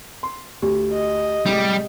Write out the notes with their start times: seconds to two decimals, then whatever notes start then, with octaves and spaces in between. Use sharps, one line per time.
0.23 C6
0.62 D2 G4
0.93 D#5
1.46 A2 C3 G3 G#3